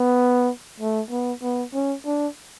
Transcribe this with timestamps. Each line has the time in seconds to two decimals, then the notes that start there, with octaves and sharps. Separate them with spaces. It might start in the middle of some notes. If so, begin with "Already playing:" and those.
Already playing: B3
0.80 A3
1.11 B3
1.42 B3
1.73 C#4
2.06 D4